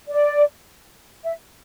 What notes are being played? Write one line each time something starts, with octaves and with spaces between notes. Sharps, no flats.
D5
E5